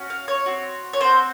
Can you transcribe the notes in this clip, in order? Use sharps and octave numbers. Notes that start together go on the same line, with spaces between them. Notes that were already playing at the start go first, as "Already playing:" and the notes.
Already playing: C#4 F#4
F5
C#5
C4 F#4
C#5
C4 F#4 C5